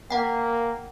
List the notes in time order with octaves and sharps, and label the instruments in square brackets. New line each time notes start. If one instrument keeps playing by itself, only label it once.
[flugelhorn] A#3 [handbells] F#5 G5